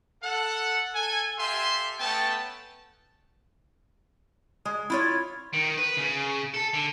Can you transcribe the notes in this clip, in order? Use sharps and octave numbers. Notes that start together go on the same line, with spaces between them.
A4 F#5
A4 G#5
G4 A4 E5 F5 G#5 C6
A3 B3 C#4 G5 A5
G#3
E4 F4 C#5
D#3
B4
C#3
A4
D3